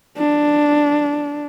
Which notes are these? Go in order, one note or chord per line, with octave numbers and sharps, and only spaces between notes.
D4